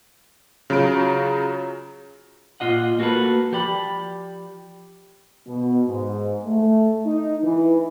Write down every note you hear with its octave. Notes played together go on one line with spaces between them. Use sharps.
C#3 F#3 F4 A#5 D7
A#2 F4 D#5 F#5
A#3 F#4 G4 A4 B4
F3 G4 D5 B5
B2
G#2
A3
D#4
E3